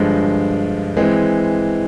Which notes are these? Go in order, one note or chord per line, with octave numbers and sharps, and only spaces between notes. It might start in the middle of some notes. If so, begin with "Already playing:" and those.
Already playing: G2 D3 F3 G#3
E3 G#3 C4